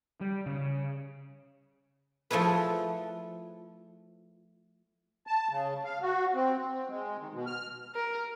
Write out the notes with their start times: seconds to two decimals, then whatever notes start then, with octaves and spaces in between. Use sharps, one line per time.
0.21 G3
0.46 C#3
2.31 F3 A3 E4 G#4 B4
5.27 A5
5.50 C#3
5.84 F5
6.02 F#4
6.35 C4
6.58 C4
6.89 G#3
7.20 D#3
7.33 B2
7.46 F6
7.95 A#4